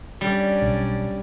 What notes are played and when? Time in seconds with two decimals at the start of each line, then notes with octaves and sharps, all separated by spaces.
0.21 G3 C#4 D4
0.62 B1